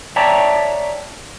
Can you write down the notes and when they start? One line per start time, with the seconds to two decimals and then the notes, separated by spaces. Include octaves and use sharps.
0.16 C#5 D5 E5 G5 A5 A#5